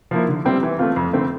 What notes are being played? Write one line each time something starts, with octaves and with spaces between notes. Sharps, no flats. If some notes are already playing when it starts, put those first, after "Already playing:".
F3 A#3 E4
D3
G3 C4 E4
E3
A3 C4 F4
F2
D3 A3 C4